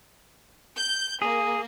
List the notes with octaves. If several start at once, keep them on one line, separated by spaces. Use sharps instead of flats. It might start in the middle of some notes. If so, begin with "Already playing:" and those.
G6
A#3 G#4